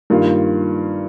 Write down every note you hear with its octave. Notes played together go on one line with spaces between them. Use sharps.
G2 D#3 A#3 F4